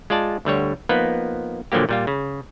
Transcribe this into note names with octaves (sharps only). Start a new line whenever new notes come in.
G#3 F4 D5 A5
D2 D3 G3 C#5
F3 A#3 B3 D#4 B4
A#2 D3 F3 F#3 A#3 G4
A#2 G3 F4
C#3